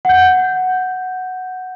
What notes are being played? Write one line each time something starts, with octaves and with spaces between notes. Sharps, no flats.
F#5 G6